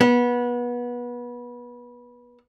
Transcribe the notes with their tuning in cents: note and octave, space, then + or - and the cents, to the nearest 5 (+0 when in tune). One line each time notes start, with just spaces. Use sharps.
B3 -25